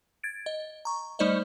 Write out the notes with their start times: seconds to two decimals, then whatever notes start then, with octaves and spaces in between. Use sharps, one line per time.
0.23 G#6 A6 D7
0.46 D#5
0.85 A#5 C#6
1.19 G3 A3 D#4 C5 D5 D#5